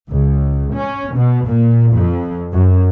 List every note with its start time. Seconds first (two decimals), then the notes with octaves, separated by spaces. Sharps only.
0.11 C#2
0.76 C#4
1.16 B2
1.49 A#2
1.94 F2
2.53 F#2